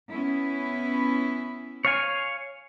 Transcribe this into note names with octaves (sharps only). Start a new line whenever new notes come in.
B3 C#4 E4
C#5 F5 G#5